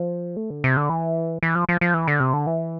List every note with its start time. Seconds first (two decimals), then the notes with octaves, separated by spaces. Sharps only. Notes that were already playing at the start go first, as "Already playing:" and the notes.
Already playing: F3
0.37 A3
0.50 D3
0.64 C3
0.77 D3
0.89 E3
1.43 E3
1.55 F3
1.69 F3
1.81 F3
1.94 E3
2.08 D3
2.20 C3
2.33 D3
2.47 E3